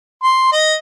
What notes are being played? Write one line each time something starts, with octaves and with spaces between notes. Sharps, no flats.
C6
D#5